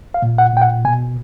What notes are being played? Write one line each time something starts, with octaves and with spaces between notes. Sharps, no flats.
F5
A#2
F#5
A#2 G5
F#5
B2 G#5